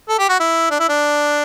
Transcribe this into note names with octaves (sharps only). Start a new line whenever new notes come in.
A4
G4
F#4
E4
D4
E4
D4